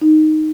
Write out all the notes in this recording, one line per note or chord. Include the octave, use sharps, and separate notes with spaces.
D#4